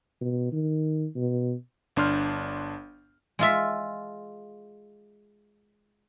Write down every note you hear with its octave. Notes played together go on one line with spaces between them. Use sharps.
B2
D#3
B2
G1 D4 C6 F6 G6
G#3 F4 E5